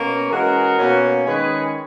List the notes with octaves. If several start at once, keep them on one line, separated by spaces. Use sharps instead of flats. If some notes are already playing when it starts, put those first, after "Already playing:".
Already playing: B2 A#3 C#4
E3 G#3 C#4 F#4 A#4
B2 A#3 C#4
D#3 G#3 C#4 G#4 B4